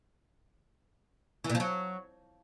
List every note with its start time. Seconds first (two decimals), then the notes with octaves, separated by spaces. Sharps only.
1.44 E3
1.50 A#2
1.55 F3
1.60 F#3